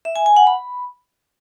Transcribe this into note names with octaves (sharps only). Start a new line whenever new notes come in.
E5
G#5
G#5
F#5
B5